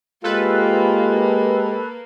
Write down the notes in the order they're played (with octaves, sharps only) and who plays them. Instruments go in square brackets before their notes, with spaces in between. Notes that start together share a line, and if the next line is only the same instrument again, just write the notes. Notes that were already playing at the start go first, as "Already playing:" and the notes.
[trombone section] G#3 G4 [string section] A#3 [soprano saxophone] F4 [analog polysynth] A4 B4